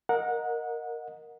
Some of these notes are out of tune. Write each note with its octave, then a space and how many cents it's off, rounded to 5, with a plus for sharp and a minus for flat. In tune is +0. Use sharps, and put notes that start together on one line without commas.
A#4 +0 D#5 +0 F#5 -25